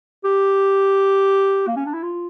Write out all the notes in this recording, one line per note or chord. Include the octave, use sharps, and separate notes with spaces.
G4
A#3
C#4
D4
E4
F4